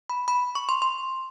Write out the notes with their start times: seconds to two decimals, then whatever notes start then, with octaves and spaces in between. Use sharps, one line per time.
0.10 B5
0.28 B5
0.55 C#6
0.69 C6
0.82 C6